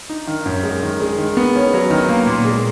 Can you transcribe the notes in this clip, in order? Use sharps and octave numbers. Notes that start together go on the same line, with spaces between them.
D#4
D#3
F#2
G#3
D#3
G#3
D#3
B3
C#4
F#3
D#3
A#3
A#2
G#3